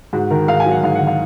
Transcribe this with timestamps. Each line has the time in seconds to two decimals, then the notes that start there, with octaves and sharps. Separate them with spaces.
0.13 G#2 F#4
0.30 D#3 A#4
0.48 G#2 F5
0.60 G#5
0.66 F#3
0.71 F#5
0.83 G#2 F5
0.95 F#5
1.01 D#3
1.07 F5